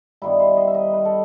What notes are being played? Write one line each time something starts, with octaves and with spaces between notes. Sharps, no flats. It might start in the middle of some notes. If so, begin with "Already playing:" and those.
G2 D#3 G3 B3 E4
C5
D#5
E5
D#5
B4
A4